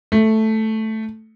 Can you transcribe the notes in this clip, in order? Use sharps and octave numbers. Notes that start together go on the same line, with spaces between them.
A3